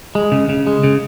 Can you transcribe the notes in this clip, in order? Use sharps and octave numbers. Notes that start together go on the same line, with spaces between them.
G#3
C#3
C#3
G#3
C#3